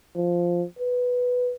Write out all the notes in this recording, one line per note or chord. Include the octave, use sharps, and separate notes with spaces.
F3
B4